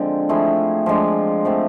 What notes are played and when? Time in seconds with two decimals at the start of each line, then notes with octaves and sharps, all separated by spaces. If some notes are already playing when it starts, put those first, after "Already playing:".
Already playing: D3 F3 G#3 C4
0.29 F3 A3 E4 G#4
0.86 F3 G#3 D4
1.45 F3 A3 C4